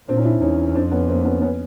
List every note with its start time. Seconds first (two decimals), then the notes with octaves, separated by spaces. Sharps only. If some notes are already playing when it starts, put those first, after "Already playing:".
0.08 A#2 C4 D4
0.17 C#4 D#4
0.25 D4 E4
0.41 E2 C#4 D#4
0.75 F2 C4 D4
0.91 B3 C#4
1.08 A#3 C4
1.25 B3 C#4
1.42 B3 C#4